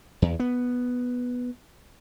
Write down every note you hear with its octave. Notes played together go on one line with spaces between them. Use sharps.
E2
B3